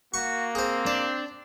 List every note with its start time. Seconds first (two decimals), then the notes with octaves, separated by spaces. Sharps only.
0.14 A#3 F#4 C#6
0.55 C4 G#4 C5
0.87 D4 D5